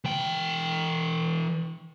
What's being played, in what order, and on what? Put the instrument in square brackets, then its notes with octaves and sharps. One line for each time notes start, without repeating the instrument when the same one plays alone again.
[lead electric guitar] E3 G5